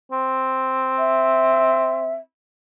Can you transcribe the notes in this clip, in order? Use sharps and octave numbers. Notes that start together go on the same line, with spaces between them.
C4
E5